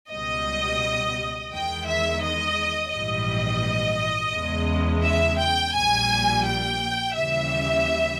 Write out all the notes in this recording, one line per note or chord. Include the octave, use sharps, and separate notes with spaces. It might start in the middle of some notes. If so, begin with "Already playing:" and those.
C#2 B2 G3 D#5
E2 D#3 G#3 G5
E5
D#5
A#1 G#2 E3 G3 D#5
E2 C#3 G#3
E5
G5
A#1 A#2 G3 G#5
G5
D#2 C#3 E3 G3 E5